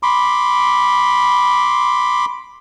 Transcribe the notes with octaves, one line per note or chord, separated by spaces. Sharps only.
B5 C6 D6